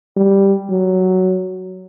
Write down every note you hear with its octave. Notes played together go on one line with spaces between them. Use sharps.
G3
F#3